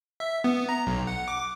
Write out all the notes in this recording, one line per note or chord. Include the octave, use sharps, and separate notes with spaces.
E5
B3
A#5
B1
F#5
D6